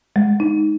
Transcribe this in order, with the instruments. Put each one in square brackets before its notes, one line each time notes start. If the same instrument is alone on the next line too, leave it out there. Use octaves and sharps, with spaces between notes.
[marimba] G#3
D#4